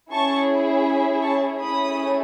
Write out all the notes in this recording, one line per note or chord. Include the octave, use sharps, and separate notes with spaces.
C#4 E4 G#4 A5 C#6
G#5 B5
A5 C#6
A3 C#4 E4 G#4 B5 D#6